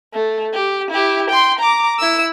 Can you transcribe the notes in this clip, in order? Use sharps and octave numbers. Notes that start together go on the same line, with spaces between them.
A3
G4
E4 G4
G5 C6
A#5 D6
E4 E6